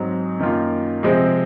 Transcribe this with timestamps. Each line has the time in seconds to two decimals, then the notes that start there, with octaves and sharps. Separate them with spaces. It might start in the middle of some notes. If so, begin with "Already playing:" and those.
Already playing: G#2 F#3 C4 D#4
0.39 F#2 D#3 A#3 F4
1.03 C3 F3 G#3 C4